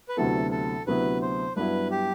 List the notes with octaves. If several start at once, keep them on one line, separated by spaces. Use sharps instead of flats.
B4
D2 C3 F#3 B3 E4 A4
A4
D2 C3 F#3 B3 E4 B4
C5
G2 F#3 B3 E4 B4
G4